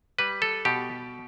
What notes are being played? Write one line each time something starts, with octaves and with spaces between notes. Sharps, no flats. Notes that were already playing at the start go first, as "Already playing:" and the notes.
G3 B4
A4
B2 G4